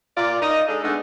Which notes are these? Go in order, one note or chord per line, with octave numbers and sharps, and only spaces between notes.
A#2 F4 D5
D#4 A#4 D#5
G#3 D4 A4
G#3 A3 B3 D4 D#4